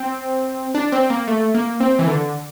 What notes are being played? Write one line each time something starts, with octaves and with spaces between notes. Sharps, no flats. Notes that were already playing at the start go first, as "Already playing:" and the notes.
Already playing: C4
D4
C4
A#3
A3
A#3
C4
E3
D3